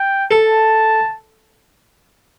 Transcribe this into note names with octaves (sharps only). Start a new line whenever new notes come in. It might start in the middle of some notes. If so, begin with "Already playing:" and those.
Already playing: G5
A4 A5